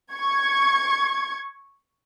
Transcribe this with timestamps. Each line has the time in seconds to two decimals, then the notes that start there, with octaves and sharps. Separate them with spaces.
0.12 C#6 G#6